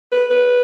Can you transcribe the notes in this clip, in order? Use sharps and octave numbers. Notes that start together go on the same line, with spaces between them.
B4
B4